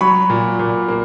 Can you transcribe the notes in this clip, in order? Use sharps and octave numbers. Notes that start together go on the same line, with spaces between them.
F#3 B5 C#6
A#2
A#2
A#3